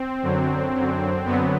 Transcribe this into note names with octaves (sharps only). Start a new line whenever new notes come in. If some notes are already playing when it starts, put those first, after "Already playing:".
Already playing: C4
F#2 D3 F#3
F#2 D3 F#3
F#2 D3 F#3 B3